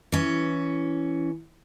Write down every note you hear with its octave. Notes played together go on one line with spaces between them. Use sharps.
E3 C#4